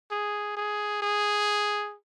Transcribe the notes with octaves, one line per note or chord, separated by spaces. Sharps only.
G#4
G#4
G#4